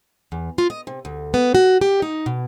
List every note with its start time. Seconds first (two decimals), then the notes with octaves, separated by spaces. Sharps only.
0.32 E2
0.58 F4
0.70 D#5
0.87 C3
1.05 D2
1.34 B3
1.55 F#4
1.81 G4
2.02 D#4
2.26 B2